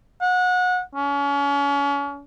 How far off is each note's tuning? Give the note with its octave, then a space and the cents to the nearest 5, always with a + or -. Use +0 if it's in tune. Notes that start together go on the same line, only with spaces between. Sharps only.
F#5 -25
C#4 +35